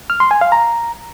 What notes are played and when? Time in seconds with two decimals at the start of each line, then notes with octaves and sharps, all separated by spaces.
0.10 F6
0.20 C6
0.31 G#5
0.41 F5
0.52 A#5